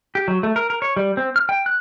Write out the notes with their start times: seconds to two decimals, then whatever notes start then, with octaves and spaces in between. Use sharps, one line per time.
0.15 G4
0.28 F#3
0.43 A3
0.56 A#4
0.70 A#4
0.82 C#5
0.96 G3
1.17 C4
1.36 F6
1.49 G5
1.66 F#6